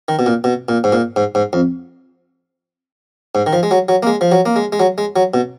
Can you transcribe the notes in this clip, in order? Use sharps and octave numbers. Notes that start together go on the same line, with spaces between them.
D#3
B2
A#2
B2
A#2
G#2
A#2
G#2
G#2
F2
G#2
D#3
F3
G#3
F#3
F#3
A#3
G#3
F3
F#3
A#3
G#3
G#3
F#3
G#3
F#3
B2